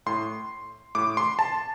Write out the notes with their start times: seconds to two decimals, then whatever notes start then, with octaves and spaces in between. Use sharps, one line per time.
0.06 A2 C6
0.95 A2 D6
1.17 C6
1.39 A5